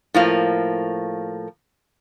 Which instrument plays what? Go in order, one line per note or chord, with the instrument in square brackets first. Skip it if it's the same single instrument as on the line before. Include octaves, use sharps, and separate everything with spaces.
[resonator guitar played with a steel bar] A2 F3 A#3